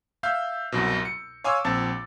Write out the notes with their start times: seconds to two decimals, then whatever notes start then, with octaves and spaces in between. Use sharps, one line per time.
0.23 E5 F5 E6 G6
0.72 C2 F#2 B2
1.05 C#7
1.44 C#5 F5 G#5 C6 D6 E6
1.64 A#1 C4 A5 A6